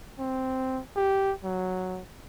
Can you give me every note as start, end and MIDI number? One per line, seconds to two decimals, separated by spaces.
0.19 0.80 60
0.96 1.33 67
1.44 2.01 54